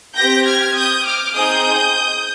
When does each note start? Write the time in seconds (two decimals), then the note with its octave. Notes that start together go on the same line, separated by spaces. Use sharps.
0.16 C4 G4 G6 A#6
0.46 F6 G#6
0.75 D#6 G6
1.05 D6 F6
1.34 C4 D#4 G#4 D#6 G6